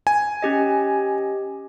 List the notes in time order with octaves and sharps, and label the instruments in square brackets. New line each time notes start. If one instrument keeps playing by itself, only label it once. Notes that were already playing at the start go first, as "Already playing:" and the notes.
[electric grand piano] G#5
[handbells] C#4 G4 D#5